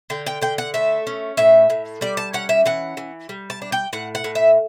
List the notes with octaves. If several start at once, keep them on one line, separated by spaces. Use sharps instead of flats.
D3 G5
G5
D3 G5
F#5
A3 E5
C#4
A2 E5
A2
G3 D5
A5
C#4 F#5
E5
E3 F#5
E3
G3
A5
D4
G5
A2 F#5
F#5
A2
E5